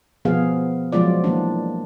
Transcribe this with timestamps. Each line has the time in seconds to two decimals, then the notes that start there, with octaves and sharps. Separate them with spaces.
0.25 B2 F3 B3 G#4 F5
0.92 F3 F#3 G#3 F4 D5
1.24 E3 A#3 D4